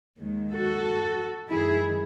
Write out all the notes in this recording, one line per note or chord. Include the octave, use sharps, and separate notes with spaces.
D#2 D#3 G#3
F#4 A4
F#2 D#3 G#3 E4 G#4